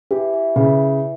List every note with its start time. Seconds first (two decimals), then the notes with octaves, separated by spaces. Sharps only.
0.11 E3 G4
0.33 E3
0.56 C#3 E3